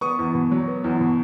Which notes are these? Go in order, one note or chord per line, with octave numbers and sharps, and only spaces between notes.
B3 C#6 D#6
E2
B2
F#3
B3
E2
B2